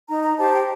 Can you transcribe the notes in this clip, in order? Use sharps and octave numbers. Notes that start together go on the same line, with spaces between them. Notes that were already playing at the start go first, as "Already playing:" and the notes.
D#4 A#5
A#5
G4 C5 A5
G5